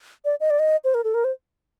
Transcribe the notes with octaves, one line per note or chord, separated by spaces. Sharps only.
D5
D#5
D5
D#5
C5
A#4
A4
A#4
C5